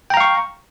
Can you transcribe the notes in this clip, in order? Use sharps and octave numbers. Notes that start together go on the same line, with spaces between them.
F5 G5 A#5 C#6